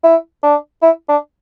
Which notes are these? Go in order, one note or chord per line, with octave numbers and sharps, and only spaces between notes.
E4
D4
E4
D4